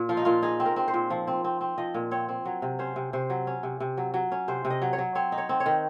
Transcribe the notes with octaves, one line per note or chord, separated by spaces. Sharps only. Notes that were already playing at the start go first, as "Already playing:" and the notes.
Already playing: A#2
F3 F4
D#4
A#2 F4
D#4 G#4
C4
A#4
C4
C5
A#2
F3
C4
C4
C4
F3 D#5
A#2
C4 C#5
C4
F#3 C#5
C3
C#4 C5
C3
C3 C5
F#3
C#4
C3
C3
F#3
F#3
C#4
C3 C5
C3
D#5
F#3
C#5
F#3
C4 C#5
D#4
C#5
C4
C#5
D#3